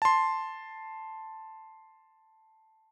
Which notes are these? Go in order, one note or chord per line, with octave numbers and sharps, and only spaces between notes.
A5 C6